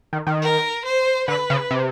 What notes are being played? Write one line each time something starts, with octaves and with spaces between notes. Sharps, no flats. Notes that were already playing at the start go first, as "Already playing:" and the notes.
D#3
D#3
A#4
C5
D3 B4
C#3
C3